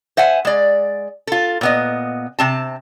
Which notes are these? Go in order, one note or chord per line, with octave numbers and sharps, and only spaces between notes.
C5 E5 F#5 G#5
G#3 D5
F4 A4
A#2 B3 D#5
C3 C4 A5